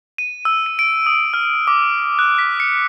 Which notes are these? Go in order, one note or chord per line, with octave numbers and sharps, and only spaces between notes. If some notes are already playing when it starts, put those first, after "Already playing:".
D#7
E6
D#7
D7
D#6
F6
D6
F#6
B6
C#7